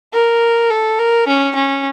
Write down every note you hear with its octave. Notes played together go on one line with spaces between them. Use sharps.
A#4
A4
A#4
C#4
C#4